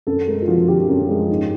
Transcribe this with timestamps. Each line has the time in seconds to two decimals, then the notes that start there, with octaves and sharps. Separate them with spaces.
0.07 F#2 A4
0.27 G#3 A#4
0.42 F4
0.48 F3 F#4
0.68 D3 G4
0.89 F#2
1.09 G#3
1.30 G#2